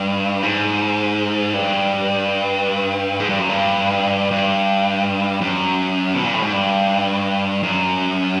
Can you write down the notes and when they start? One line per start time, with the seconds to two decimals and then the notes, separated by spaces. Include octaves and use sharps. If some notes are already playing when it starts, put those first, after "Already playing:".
Already playing: G2
0.43 G#2
1.54 G2
3.20 G#2
3.29 G2
3.39 F#2
3.49 G2
4.31 G2
5.41 F#2
6.14 B2
6.24 A#2
6.33 A2
6.42 G#2
6.53 G2
7.63 F#2